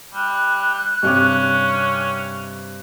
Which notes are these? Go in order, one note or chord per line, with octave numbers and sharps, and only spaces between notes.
G3 F#6
G2 C3 C#4 D6